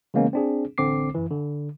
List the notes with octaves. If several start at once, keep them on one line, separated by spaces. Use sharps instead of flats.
C#3 E3 G#3 A#3 B3 C#4
C4 D4 G#4
A1 D3 C4 D6 C7
F#2 E3
D3